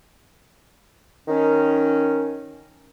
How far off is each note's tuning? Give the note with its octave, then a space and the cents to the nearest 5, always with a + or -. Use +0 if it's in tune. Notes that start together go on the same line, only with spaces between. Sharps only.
D#3 +0 C#4 +0